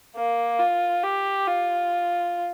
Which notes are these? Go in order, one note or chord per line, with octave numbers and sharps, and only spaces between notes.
A#3
F4
G4
F4